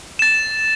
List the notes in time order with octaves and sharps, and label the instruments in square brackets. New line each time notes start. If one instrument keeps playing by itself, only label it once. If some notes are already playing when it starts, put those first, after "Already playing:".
[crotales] A6 E7